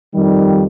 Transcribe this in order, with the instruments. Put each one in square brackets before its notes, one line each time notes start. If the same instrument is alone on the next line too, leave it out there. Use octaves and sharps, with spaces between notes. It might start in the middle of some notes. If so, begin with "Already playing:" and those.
[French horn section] F2 D#3 G3